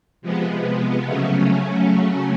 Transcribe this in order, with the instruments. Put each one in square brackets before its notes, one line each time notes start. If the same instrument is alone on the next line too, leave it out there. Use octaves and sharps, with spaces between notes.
[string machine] C3 F3 G#3 B3
C#3 F#3 A3 C#4